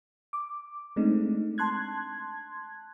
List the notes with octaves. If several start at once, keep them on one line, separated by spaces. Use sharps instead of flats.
D6
G#3 A3 C4 D4 D#4
A5 C6 F#6 G#6